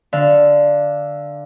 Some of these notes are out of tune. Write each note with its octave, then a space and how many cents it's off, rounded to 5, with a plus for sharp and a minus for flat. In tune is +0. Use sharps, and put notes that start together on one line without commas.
D3 +0 F5 -10